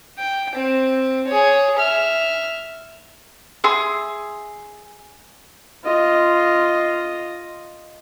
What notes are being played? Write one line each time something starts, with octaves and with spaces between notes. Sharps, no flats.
G5
C4
G#4 C#5
E5 F6
G#4 E5 C6
F4 D#5